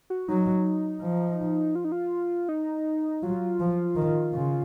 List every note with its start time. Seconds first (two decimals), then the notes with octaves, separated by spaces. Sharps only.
0.10 F#4
0.28 F#3 D#4
1.02 F3
1.75 F4
1.84 D#4
1.92 F4
2.49 D#4
3.23 F#3 F4
3.60 F3
3.96 D#3
4.33 C#3